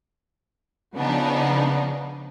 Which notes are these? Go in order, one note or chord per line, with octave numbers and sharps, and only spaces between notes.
C#3 F3 B3 D4 D#4